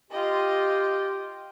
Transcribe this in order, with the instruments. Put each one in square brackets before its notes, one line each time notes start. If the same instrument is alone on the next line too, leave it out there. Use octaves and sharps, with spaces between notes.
[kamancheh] F4 D#5 [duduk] G4